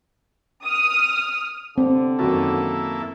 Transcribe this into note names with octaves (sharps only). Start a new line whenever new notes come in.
D#6 F6
D3 C4
F#2 D#3 A#3 E4 F#4 A4